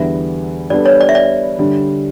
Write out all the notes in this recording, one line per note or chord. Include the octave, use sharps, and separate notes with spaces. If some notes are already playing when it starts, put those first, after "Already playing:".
Already playing: E2 D3 G3 B3 E5
G3 B3 D4 A4 D5
C#5
D5
E5
D5
D3 G3